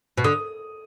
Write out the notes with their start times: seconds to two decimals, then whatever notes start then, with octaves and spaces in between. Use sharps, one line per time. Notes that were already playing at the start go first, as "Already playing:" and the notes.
0.18 B2
0.24 D3 D#6